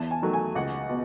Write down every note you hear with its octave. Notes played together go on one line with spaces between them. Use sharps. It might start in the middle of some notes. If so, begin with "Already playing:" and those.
Already playing: E2 A5
G#5
D#3 F#3 A3
G#5
C#2 F#5
B2